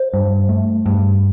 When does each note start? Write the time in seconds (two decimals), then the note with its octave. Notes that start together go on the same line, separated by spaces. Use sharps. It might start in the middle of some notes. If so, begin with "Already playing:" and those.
Already playing: C5
0.13 G2
0.49 A3
0.86 G2